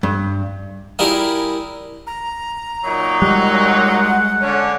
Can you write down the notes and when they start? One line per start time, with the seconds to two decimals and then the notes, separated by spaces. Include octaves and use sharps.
0.03 G2
0.99 G3 E4 F4 G#4 A#4
2.07 A#5
2.84 A#2 F#3 D#4
3.22 G3 G#3 F#5
4.41 D3 C#4 C#5